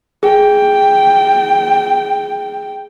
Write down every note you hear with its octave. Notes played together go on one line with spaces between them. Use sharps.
G#4 G5